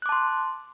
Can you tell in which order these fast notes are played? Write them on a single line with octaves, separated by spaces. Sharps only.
F#6 D6 A5 C6